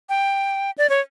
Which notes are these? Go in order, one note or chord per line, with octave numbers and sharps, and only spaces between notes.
G5
D5
C#5